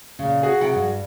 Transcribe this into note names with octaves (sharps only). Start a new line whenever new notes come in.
A#2 C#3
F#4 G#4
C3 F#5 G5
G2